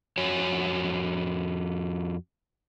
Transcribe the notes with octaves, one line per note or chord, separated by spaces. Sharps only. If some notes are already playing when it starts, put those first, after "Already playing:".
F2 F#4 C#5 G#5